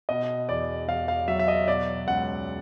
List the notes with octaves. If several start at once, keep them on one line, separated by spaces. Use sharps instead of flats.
B2 D#5
E2 D5
E2 F5
F5
F#3 E5
E5
D#5
B2 D5
C#2 F#5